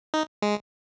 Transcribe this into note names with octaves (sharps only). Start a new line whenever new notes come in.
D#4
G#3